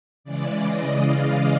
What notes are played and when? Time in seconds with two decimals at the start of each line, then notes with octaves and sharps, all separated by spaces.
0.24 C#3 E3 G#3 D5
0.60 D#5
0.96 F5